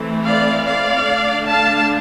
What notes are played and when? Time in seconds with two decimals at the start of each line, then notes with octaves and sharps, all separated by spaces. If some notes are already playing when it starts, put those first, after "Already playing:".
Already playing: E3 A3 C4
0.25 D5 F5
0.65 D5 F5
1.06 D3 A3 D4
1.47 F5 A5